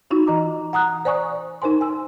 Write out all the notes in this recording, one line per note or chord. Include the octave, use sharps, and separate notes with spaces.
D#4 F4 F#4
E3 D#5 A#5 D6
F#5 A#5 D#6 F#6
C5 D5 G#5 C#6 D#6
D#4 A#4 C5 G#5 C6
G#5 E6